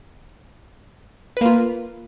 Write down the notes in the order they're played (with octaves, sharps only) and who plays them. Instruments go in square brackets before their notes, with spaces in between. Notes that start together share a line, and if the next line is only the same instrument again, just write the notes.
[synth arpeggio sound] B4
A#3
F4